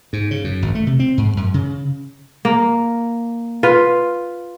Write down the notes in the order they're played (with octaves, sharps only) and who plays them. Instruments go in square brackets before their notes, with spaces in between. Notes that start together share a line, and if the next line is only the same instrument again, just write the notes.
[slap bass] G#2
C#3
F#2
G#1
A3
C3
C4
G#2
F#2
C#3
[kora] A#3
F4 B4